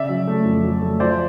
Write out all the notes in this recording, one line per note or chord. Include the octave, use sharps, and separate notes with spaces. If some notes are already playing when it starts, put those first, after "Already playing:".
Already playing: C#3 D5 E5
F#3
A3
F2
F#3
A3
F3 C5 D5